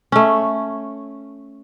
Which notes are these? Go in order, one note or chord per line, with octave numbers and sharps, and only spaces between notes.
A3 C#4